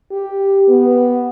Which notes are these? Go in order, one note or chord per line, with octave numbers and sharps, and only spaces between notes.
G4
B3